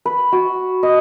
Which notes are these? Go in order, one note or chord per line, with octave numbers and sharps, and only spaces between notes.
B4
F#4
D#5